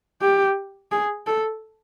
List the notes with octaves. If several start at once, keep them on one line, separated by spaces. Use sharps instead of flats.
G4
G#4
A4